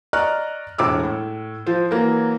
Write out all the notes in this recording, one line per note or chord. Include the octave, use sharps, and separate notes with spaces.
D5 D#5 A#5 C#6 F6 F#6
E1 A2 D6 E6
A2
F3 C5
E3 F#3 A#3